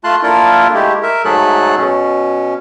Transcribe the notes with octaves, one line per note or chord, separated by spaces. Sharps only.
A3 F4 A5 C6 F#6
A#3 D4 E4 F4 A4 A#4
G#3 A3 E4 G4
A#4 E5
G#2 F#3 A3 G#4 A4 F#6
B2 C#4